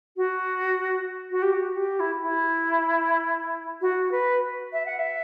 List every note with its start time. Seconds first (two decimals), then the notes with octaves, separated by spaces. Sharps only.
0.16 F#4
1.30 F#4
1.42 G4
1.53 F#4
1.76 G4
1.99 E4
2.21 E4
3.81 F#4
4.11 B4
4.72 E5
4.86 F#5
4.98 E5